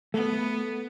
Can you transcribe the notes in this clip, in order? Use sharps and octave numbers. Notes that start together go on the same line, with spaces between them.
A3 B3